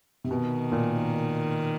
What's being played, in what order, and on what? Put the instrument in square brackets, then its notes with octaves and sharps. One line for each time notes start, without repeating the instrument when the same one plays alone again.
[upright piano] C3
[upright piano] B2 [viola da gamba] D#3
[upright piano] A#2